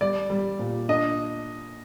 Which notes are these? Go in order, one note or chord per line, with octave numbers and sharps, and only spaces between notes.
G3 D5
G3
A#2
D4 D#5